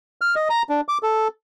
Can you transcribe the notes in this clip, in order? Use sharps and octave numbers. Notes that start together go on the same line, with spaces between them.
F6
D#5
A#5
D4
D6
A4